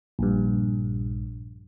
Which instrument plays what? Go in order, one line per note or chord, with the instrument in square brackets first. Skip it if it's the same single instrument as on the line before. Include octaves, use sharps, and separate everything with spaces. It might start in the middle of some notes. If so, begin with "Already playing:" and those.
[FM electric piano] A#1 G2